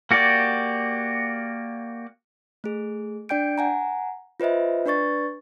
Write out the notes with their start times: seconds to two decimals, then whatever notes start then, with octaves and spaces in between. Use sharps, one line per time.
0.11 A#3 F#4 G4 D5
2.64 A3 G#4
3.29 D4 D5 G5 G6 D7
3.58 F#5 G#5 A#5
4.40 F4 B4 C5 D#5 E5
4.86 D4 B4 D5 C#6 A6